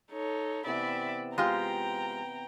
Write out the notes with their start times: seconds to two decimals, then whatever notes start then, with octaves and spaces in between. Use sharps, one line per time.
0.12 D#4 A4 C#5
0.66 C3 E3 B3 D5 E5 B5
1.38 G#3 F4 G4 G5 A#5